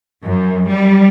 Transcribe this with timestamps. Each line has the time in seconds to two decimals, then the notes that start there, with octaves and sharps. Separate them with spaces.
0.23 F#2
0.68 G3